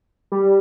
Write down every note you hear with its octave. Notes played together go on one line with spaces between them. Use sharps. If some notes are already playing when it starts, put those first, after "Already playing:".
G3